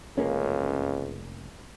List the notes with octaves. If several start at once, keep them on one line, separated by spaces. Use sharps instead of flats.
F1 C#2 A#3 C#4